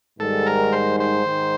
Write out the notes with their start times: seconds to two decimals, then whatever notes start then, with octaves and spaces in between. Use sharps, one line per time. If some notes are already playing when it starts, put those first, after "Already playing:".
0.20 G#2 D#3 G3 A4
0.46 A#4
0.73 C5
1.00 C5
1.26 G#2 D#3